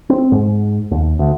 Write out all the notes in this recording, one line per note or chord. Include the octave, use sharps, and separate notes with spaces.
C4
G#2
D#2
D2